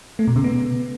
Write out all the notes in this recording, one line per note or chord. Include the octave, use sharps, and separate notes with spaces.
A3
B2
C#3
B3